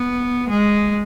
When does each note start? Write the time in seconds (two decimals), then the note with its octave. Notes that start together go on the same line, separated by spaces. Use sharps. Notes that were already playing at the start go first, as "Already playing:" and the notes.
Already playing: B3
0.49 G#3